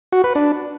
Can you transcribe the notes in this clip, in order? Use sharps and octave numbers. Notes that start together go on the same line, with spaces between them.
F#4
B4
D4